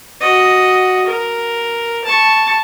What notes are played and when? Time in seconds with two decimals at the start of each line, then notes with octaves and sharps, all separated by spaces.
0.20 F#4 D#5
1.06 A#4
2.04 A5 C#6